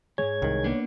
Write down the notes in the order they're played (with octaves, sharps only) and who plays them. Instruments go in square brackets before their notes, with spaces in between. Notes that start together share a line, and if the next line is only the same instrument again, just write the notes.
[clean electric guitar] D#2 G#2 [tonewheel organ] G#3 G#4 G#6 [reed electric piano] C#5
[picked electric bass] C2 D#3
[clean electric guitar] A#3 B3 D4